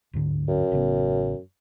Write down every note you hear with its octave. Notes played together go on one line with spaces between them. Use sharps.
D1 G#2 D3
F#2
A1 C#3 B3